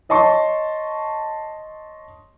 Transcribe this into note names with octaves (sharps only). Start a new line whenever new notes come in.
C#5 D#5 A5 C6 C#6